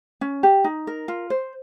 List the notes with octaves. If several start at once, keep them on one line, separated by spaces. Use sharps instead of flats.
C#4
G4
D#4
A#4
F4
C5